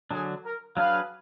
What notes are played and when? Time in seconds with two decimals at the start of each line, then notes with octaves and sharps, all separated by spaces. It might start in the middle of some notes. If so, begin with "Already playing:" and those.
0.11 D3 F#3 D4 G#4
0.44 A#4
0.76 F#3 D4 G#4 B4 F5